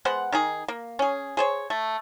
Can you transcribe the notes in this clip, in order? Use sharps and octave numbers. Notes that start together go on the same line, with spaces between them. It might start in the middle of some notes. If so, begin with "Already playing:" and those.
G#3 B3 C5 F#5
D#3 D#4 G#4
A#3
C#4 G#4
G#4 C5 C#5
A3